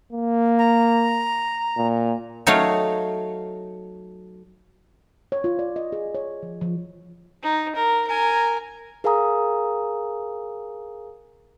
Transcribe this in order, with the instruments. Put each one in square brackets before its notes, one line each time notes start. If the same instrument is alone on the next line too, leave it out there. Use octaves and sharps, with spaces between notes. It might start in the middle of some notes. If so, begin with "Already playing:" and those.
[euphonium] A#3
[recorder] A#5
[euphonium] A#2
[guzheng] F#3 A3 D#4 C#5 F5
[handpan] C#5
F4
D5
D#5
G#4
C#5
F3
F3
[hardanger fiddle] D#4
A#4
A#4 G#5
[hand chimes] G#4 A#4 F5 G#5 A#5 D#6